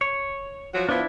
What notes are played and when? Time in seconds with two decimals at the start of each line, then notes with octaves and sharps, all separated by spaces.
0.01 C#5
0.74 F3 F#3 F#4
0.89 F3 B3 D4 E4